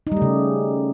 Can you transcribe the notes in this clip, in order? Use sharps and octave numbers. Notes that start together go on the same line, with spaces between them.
D#4
G3
A3
C#3